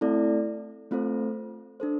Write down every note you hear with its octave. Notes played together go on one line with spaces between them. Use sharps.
A3 C4 E4 A4 D5
A3 C4 F4 A4 C5
D4 A4 C5